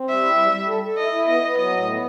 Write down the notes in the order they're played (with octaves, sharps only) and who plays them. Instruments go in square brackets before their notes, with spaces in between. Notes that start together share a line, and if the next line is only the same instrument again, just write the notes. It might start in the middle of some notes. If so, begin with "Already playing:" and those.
Already playing: [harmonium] C4
[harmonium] G3 [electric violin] E5
[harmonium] E4
G3
G3
A4
A4
[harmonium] E4 [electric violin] D#5
[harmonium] E4
[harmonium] B3 [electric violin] D#5
[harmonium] B3
[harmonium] F#3 [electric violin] D#5
[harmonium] A2
B3